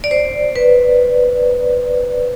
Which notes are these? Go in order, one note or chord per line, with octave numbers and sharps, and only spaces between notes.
D5
C5
B4